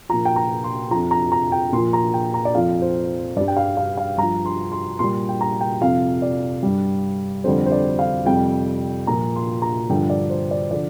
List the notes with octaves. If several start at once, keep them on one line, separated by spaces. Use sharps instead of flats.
A#2 F3 A#5
G5
A#5
C6
F2 F3 A#5
A#5
A#5
G5
A#2 C6
F3
A#5
G5
A#5
D5
F2 F3 F5
C5
G2 G3 D5
G5
F5
F5
F5
G2 A#5
F3
C6
C6
A#2 G3 C6
G5
A#5
G5
F2 C3 F3 F5
D5
G2 G3
F2 D3 G3 C5
C5
D5
F5
F2 C3 G3 G5
A#2 F3 A#5
C6
A#5
G2 D3 F3 G5
D5
C5
D5
D3 F3 D5